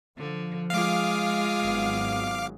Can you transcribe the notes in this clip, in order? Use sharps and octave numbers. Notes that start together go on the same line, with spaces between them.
D3 F3
G#3 F4 G#4 F5 D6
G#1 F#3 B3